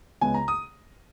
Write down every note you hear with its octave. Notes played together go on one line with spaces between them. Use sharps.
C#2 C#3 G#3 B3 G#5
A#5
D#6